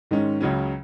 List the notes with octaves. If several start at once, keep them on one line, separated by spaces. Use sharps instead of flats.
G#2 D#3 G#3 C#4
C#2 C#3 F#3 C#4